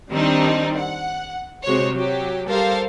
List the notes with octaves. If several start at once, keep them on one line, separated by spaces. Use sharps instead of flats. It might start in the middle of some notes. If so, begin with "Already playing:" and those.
D#3 G3 C4 D4 D#4
F#5
C3 G#3 F#4 C5 C#5
F#3 G4
G3 G4 A4 A#4 C5 F5